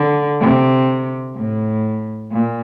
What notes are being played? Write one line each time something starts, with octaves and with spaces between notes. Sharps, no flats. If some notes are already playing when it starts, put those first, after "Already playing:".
Already playing: D3
C3
A2
A#2